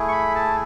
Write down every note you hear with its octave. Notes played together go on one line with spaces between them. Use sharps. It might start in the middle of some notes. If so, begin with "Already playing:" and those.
Already playing: A3 E4 G#4
C#6
B5
A5